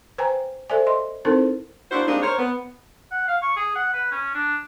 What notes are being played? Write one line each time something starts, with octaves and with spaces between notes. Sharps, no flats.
B4 C5 G5 G#5 A#5
A4 C5 D5 E5 G#5
D#5 C6
C4 D#4 E4 A4 A#4 C5
A#3 D4 E4 F#4 C5
G3 G#3 A#3 C4 D4 D#4
A#4 C5 C#5
B3
F#5
F5
C#6
G#4
F#5
B4
C#4
D4